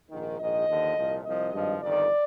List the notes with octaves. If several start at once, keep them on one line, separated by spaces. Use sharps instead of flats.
A#1 G#2 D#3
A#1 G#2 D#3 D#5
D#2 D3 F3
C2 A#2 F3
C2 C3 F3 D#5
G#1 G2 F3
G1 F2 D#3 D5